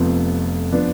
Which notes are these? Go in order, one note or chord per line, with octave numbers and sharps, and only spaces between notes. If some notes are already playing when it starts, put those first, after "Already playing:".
Already playing: F1 F2 F3 B3
F3 B3 D4